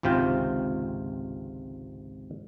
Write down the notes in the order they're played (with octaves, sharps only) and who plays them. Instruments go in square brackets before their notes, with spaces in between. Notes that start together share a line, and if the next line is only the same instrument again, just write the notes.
[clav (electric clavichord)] G#1 C#2 C3 F4 G5